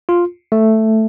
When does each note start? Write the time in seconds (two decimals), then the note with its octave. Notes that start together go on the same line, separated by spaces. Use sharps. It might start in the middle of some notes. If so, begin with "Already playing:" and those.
0.09 F4
0.52 A3